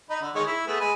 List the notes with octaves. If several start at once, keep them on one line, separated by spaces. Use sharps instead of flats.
D#4 B5
D3
D#3 G#3 C#5
E4
A3 B3 G#4
G#3 G#5 B5